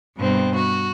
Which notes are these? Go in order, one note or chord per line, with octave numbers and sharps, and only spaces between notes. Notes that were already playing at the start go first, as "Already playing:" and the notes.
G2 B2 C4
F#4